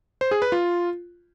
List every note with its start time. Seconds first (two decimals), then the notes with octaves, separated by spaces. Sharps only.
0.21 C5
0.31 G#4
0.42 B4
0.52 F4